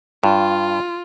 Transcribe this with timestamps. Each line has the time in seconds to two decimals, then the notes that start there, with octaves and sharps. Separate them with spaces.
0.24 G2 F4